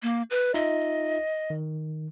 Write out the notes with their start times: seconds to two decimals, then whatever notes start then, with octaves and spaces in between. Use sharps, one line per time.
0.03 A#3
0.30 B4
0.54 D#4 F4 D#5 E5
1.50 D#3